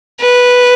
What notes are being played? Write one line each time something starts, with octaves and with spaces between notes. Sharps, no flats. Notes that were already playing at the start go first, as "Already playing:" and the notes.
B4